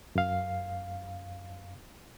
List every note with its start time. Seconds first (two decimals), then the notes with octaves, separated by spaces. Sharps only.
0.15 F#2 F5